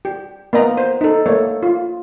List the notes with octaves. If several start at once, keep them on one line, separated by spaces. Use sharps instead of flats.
G4
A#3 B3 D#5 A#5
C5
D#4 A4
A3 A#3 A4 C#5
F4